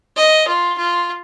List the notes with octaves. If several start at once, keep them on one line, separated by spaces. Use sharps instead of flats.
D#5
F4
F4